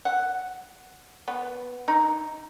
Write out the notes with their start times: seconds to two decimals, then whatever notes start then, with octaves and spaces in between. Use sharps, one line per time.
0.05 F#5
1.28 B3
1.88 D#4